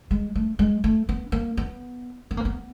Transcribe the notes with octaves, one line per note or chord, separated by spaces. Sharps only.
G#3
A3
G#3
A3
B3
A#3
B3
B3
A#3
B3